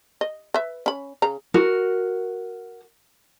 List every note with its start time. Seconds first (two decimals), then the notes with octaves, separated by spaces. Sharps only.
0.21 D#5
0.54 B4 E5
0.86 C#4 B5
1.22 C#3 A#5
1.54 F#4 A#4